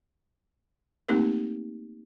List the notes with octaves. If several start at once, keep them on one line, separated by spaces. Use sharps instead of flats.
A3 A#3 C4 D#4 G4 A#4